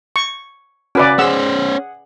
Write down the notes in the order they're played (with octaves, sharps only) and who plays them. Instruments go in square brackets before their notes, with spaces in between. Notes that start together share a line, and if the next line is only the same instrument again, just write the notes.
[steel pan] C#6
[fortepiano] C#3 F#4 [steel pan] C#4 B4 D5
[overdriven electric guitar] C#4 C5 [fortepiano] G#4 F#5 [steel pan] E6